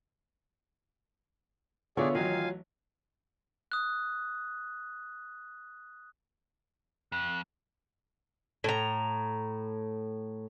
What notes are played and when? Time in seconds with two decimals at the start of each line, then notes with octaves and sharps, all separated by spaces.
1.97 D3 B3 F4 G#4 C#5 D5 E5
2.15 A1 D#3 F#3 F4 F5 G#5
3.72 D#6 F#6
7.12 F2 F#6
8.64 A2 A#5